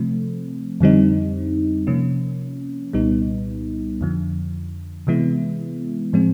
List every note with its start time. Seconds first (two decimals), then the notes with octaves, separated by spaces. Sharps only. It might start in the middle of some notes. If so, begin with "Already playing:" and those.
Already playing: C3 F3 A3 C4
0.81 F2 D3 G3 C4 D#4
1.87 C3 F3 A#3 C#4
2.93 C2 A#2 G3 B3 D#4
4.01 F2 D3 F3
5.07 C3 E3 G#3 B3 E4
6.13 A2 F3 G#3 C4